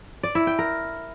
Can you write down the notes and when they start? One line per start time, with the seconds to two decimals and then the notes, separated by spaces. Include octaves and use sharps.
0.23 D5
0.35 E4
0.47 G5
0.59 A#4